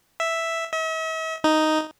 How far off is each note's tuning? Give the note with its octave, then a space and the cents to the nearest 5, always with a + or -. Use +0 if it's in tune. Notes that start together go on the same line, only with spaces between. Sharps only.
E5 +0
E5 -45
D#4 +0